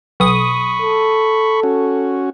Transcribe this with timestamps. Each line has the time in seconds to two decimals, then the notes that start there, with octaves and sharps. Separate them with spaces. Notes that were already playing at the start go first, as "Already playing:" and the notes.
0.20 B1 B5 C#6 D#6
0.81 A4
1.63 C#4 F#4